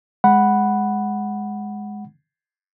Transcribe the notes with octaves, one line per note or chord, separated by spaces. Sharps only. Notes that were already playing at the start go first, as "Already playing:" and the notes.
G#3 F#5 B5